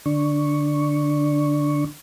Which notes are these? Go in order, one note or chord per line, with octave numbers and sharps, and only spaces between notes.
D3 D4 C#6